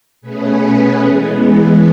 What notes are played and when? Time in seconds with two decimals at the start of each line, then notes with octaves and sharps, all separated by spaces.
0.21 B2 A3 C#4 G#4 B4
1.02 E3 G#3 B3